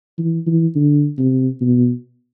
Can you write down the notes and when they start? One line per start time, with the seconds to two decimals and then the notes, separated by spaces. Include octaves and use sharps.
0.19 E3
0.47 E3
0.75 D3
1.19 C3
1.61 B2